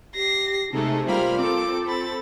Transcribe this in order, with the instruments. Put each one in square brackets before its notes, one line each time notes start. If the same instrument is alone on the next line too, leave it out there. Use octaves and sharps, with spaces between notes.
[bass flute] G4 [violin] A#6 C7
[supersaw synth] C3 G#3 A3 [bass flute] D#4 [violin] A4
[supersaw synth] G3 B5 F6 [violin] A#3 C4 [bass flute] F4
[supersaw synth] C4 A4 [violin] D6
[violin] B5 A6